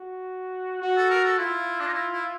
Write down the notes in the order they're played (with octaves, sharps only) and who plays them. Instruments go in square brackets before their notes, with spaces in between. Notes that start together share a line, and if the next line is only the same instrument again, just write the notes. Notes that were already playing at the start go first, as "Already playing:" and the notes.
Already playing: [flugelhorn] F#4
F#4
[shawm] A4
A#4
A4
[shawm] E4 [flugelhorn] F4
[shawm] D4
D#4
E4
E4